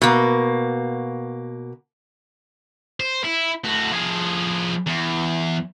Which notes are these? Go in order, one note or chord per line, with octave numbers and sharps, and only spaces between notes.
B2 A#3
C5
E4
A2 F#4
F3 G#4
E2